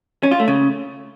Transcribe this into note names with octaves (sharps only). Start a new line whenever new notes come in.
C#4
F4
A3
C#3